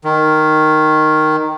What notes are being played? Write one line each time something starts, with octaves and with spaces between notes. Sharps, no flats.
D#3